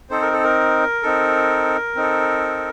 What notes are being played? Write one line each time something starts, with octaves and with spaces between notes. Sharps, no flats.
C4 D#4 A4 C5
A#4
A4
A#4
C4 D#4 A4
C4 D#4 A4